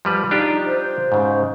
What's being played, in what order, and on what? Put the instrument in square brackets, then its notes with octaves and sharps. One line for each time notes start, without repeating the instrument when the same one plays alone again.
[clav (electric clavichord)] F3 G3 B4
[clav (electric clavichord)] D4 F4 G4 [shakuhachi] D#4
[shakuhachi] C5
[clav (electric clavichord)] G#2 C#3